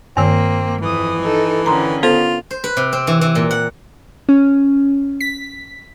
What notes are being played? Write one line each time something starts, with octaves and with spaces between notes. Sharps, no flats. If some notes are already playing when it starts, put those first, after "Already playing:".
G2 D#3 A#3 C4
F2 E3 D#6
D#4 A4
D3 D#3 C#4 A#5 C6
B3 F4 A4 C5
C5
B4
C3
C4
E3
E3
A#2
F#5
C#4
B6